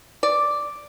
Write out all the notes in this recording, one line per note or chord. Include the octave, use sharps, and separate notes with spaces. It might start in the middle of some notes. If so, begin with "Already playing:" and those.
D5